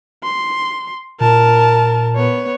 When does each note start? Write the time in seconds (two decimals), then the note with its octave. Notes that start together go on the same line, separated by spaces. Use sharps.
0.23 C6
1.20 A#2 A#4 A5
2.16 B3 C#5